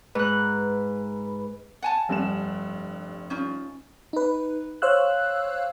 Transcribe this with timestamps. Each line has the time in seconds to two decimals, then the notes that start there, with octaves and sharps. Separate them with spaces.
0.15 G#2 B4 F#6
1.82 F#5 G#5 A5
2.09 F1 G2 E7
3.30 C#4 D#4 F4
4.13 D#4 B4
4.82 C5 C#5 F5 E6 F#6